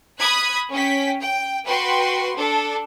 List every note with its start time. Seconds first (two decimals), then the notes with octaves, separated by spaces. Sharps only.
0.20 B5 D#6 F#6 G#6 B6
0.73 C#4 G5 B6
1.21 G5
1.67 F#4 B4 G5 C6
2.36 D4 A4